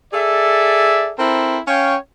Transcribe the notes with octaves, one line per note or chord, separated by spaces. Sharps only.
G#4 A4 D5 E5
C4 E4 A4 A#4
C#4 C#5 F5 G5